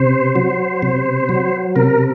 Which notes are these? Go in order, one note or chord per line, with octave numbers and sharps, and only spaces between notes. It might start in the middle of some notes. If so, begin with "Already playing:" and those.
Already playing: C3 C5
F#3
C3
F#3
C3 A#4